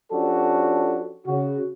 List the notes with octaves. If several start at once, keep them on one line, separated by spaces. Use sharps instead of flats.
F3 C#4 D4 F#4 G4 A4
C#3 F#4